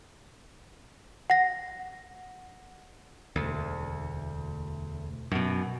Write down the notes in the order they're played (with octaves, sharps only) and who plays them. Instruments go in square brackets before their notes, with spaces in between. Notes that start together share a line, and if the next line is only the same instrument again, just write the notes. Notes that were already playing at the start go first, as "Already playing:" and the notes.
[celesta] F#5 A#6
[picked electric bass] E1 D2
F#2 B2